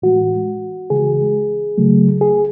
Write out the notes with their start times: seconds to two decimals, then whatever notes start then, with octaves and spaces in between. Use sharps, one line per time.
0.02 A2 E3 G#3 F#4
0.90 C#3 E3 G#3 G#4
1.78 C#3 F#3 A3
2.21 G#4